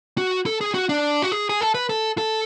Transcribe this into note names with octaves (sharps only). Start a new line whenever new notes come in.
F#4
A4
G#4
F#4
D4
F#4
G#4
G#4
A4
B4
A4
A4